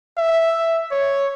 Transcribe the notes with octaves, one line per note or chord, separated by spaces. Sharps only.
E5
C#5